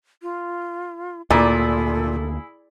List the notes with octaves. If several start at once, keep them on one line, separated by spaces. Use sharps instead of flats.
F4
D2 A#2 A#3 E4 G#4 A4